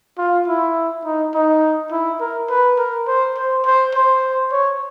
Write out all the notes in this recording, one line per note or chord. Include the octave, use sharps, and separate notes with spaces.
F4
E4
D#4
D#4
E4
A#4
B4
A#4
C5
C5
C5
C5
C#5